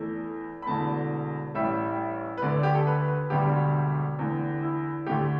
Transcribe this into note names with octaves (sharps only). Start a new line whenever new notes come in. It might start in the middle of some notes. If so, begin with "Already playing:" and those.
Already playing: E2 E3 A3
B5
E1 E2 D3 A3 A5
A1 A2 G3 E5
B4
D2 D3 A3 D5
G4
A4
B4
B4
E1 D2 D3 G3 G4
E2 D3 A3
E4
D2 D3 A3 G4